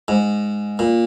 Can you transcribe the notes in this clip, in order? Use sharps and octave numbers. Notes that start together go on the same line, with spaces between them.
G#2
A#2